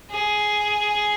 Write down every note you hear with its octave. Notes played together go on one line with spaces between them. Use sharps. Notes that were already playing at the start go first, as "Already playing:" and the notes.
G#4